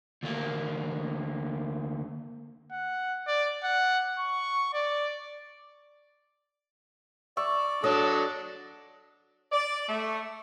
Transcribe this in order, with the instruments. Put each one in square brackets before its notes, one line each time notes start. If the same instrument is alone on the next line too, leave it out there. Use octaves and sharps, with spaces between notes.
[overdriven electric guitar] D2 A#3
[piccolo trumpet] F#5
D5
F#5
C#6
D5
[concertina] D5 [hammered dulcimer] E5 C#6
[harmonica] F#3 D4 A4 [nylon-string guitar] C#5 [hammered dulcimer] D#5
[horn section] D5
A3